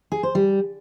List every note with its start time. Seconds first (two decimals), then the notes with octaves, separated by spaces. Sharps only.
0.12 G#4
0.23 C5
0.35 G3